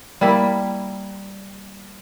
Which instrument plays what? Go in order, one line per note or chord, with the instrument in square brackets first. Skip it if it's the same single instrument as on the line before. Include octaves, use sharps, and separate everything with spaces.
[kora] G3 A#3 E4 E5